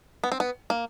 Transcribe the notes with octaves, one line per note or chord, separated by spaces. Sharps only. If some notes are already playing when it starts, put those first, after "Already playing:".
B3
C4
B3
A#3